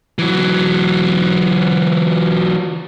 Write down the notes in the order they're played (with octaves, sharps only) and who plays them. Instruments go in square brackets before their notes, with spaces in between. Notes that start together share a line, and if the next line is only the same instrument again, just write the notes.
[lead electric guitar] E3 F#3